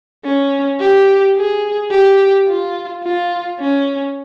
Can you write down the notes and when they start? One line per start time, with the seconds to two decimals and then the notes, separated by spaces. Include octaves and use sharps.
0.24 C#4
0.80 G4
1.37 G#4
1.92 G4
2.48 F4
3.04 F4
3.60 C#4